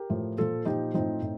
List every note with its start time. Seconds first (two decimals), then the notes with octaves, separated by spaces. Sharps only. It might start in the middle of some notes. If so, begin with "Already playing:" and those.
Already playing: G4 A#4
0.10 A2 F3
0.37 A#2 F3 F4 A4
0.65 A#2 F3 D#4 G4
0.94 A2 F3 C4 D#4
1.22 A2